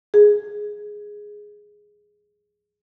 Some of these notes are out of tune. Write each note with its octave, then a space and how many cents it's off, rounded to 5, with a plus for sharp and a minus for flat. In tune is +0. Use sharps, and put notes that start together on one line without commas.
G#4 +0